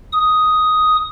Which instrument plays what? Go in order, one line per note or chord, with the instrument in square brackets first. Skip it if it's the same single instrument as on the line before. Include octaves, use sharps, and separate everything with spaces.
[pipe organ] D#6